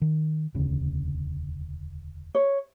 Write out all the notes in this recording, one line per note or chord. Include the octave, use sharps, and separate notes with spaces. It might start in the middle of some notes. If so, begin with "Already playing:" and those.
D#3
E1 D2 C#3
C#5